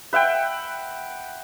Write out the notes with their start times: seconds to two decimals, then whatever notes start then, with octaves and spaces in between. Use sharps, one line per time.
0.13 B4 E5 F#5 G5